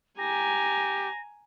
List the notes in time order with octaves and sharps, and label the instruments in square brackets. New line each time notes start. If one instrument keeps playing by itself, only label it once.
[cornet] G4 [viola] G#5 A#5 [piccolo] A#6